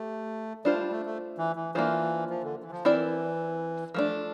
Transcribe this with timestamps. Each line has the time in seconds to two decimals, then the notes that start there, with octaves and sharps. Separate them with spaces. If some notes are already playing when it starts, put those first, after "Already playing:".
Already playing: A3 G4
0.65 G3 D4 F4 C5
0.73 A3
0.79 G3
0.92 A3
1.06 A3
1.38 E3
1.56 E3
1.75 E3 A#3 D4 F4 C5
2.30 F3
2.43 D3
2.63 E3
2.71 F3
2.85 E3 C4 E4 A#4 D5
3.94 F3 A3 D4